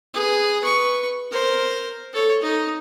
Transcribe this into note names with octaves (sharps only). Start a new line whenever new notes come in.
G#4 B4
B4 C#6
A#4 C5
A4 C#5
D#4